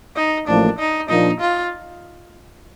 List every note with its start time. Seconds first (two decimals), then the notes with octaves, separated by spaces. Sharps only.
0.16 D#4
0.47 A1 A2 F3 A#3 D4
0.79 D#4
1.09 A#2 F3 A#3 D4 D#4
1.40 F4